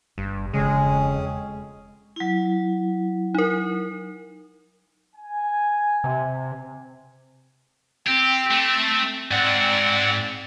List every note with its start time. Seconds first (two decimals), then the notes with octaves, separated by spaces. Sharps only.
0.18 G1 G2
0.53 E1 F2 C#3 G#3 C#4 G#4
2.16 F#3 E4
3.35 D#4 A#4
5.15 G#5
6.04 C3
8.07 C4 G4
8.51 A3
9.31 G#2 C4 D5 F#5